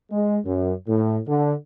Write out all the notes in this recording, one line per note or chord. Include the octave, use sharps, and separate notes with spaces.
G#3
F#2
A2
D3